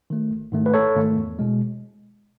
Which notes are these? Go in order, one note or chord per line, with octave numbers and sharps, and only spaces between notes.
D#3 A3
G#1
G#2 D#3 A3
B4
G#1 A4 C#5
G#2 D#3 A3
E2
B2 G#3